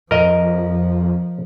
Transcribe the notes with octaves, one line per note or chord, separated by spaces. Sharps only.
F2 F3 A#4 D#5